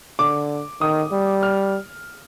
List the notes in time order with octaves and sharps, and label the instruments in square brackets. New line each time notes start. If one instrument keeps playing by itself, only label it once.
[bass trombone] D3 [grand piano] D6
[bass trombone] D#3 [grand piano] D#6
[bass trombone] G3
[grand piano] F6